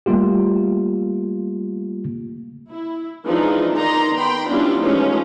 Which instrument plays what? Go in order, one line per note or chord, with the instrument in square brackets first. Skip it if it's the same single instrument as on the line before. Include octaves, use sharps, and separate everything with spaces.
[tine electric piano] G3 A3 A#3 F4 G4
[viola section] E4
E3 F3 G#3 D4 D#4 F4
D#3 D#4 D5 A#5 C6
B3 G5 B5 C6
G3 B3 C#4 D4 E4 F4
E3 F3 G#3 A3 C#4 D#4